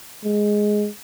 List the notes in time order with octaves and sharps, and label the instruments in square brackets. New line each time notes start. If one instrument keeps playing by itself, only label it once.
[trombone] G#3